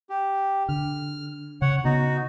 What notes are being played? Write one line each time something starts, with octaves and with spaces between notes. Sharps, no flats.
G4
D3 F6
C#3 C#5 F#5
C#3 B3 D#4 F#4